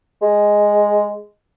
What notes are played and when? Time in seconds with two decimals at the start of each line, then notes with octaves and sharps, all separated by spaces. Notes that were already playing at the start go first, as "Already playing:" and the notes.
0.22 G#3